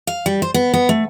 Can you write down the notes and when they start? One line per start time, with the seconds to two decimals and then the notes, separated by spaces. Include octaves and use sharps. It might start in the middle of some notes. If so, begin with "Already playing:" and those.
0.07 F5
0.26 G3
0.42 C5
0.54 B3
0.74 B3
0.89 A3